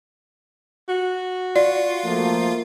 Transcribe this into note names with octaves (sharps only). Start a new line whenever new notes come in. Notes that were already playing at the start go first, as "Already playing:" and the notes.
F#4
F4 D5
F3 A3 A#3